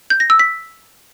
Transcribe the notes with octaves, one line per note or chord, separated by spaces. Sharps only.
G6
A#6
E6
B6